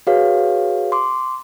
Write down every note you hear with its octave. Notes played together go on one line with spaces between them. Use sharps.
F#4 G#4 B4 C#5 F5
C6 D6